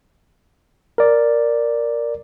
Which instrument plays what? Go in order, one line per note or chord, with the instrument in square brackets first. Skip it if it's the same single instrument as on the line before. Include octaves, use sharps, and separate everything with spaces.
[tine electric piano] A#4 D5